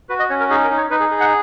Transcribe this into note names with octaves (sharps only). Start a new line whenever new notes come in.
F#4 B4
D#5
C#4 C#5
A#4
D#4 G#4
A#4
D#4
C#5
D#4 B4
G#4
G#4
F#5